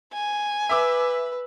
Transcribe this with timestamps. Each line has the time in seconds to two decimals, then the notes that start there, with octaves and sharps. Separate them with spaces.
0.13 G#5
0.69 B4 E5 D6 E6